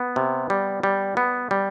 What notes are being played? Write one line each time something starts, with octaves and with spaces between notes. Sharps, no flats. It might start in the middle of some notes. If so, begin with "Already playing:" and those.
Already playing: B3
C3
G3
G3
B3
G3